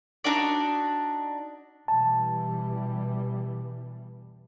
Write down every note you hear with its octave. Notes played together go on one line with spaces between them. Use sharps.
D4 D#4 F#4 D5
B2 E3 G3 A5